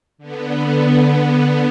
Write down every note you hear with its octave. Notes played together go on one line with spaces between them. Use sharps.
D3 B3